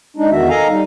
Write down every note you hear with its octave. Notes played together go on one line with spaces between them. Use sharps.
G#3 D4 D#4
E2 D#3 F#4 E5
A4 A#4 D#5 F5 G#5 A#5
G3 D#4